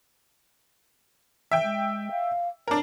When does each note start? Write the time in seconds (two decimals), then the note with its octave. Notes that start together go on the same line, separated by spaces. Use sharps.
1.51 E3 E5 G5
1.63 G#3
2.11 F5
2.68 D4 A#4 C#5